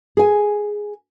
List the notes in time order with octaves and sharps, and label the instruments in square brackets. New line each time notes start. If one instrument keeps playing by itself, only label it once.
[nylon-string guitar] G#4 G#5